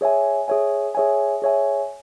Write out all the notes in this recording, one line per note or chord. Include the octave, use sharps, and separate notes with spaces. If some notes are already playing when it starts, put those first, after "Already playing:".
G#4 C#5 E5 G#5
G#4 C#5 E5 G#5
G#4 C#5 E5 G#5
G#4 C#5 E5 G#5